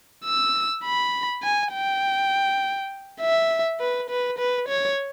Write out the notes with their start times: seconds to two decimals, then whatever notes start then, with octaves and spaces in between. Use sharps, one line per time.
0.25 E6
0.84 B5
1.43 G#5
1.73 G5
3.21 E5
3.80 B4
4.10 B4
4.38 B4
4.68 C#5